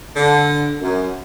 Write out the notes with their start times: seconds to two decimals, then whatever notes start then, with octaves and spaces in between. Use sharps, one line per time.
0.16 D3
0.81 F#2